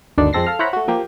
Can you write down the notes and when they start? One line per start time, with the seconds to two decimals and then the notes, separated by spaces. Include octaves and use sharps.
0.18 G1 D2 D#3 D4
0.33 F2 G#3 C4 A4 A#6 C7
0.46 A4 F5 F6
0.59 E4 C5 C#5 F#5 A#5 B5
0.73 A3 F#4
0.88 F3 A#3 G4